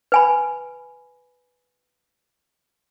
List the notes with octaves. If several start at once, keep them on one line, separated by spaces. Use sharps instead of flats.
B4 G#5 B5